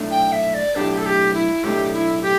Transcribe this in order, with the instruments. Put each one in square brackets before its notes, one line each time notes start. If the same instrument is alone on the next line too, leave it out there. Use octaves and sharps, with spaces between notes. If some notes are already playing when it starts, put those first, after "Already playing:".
Already playing: [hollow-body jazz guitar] B1 A2 A3 D4
[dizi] G5
E5
D5
[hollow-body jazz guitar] B1 A2 A3 D4 [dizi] G4
[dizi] A4
G4
E4
[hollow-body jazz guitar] B1 A2 A3 D4 [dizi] G4
[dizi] E4
G4